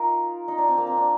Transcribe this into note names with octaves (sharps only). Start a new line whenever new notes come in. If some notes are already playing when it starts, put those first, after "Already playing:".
Already playing: D#4 F4 A#4
D#4
D4
C4
A#3
C4
D4